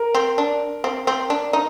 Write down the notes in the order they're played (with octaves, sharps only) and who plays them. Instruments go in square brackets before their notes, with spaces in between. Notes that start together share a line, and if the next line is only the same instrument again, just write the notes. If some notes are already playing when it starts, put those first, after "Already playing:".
Already playing: [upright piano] A#4
[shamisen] C4
D4
C4
C4
D4
D#4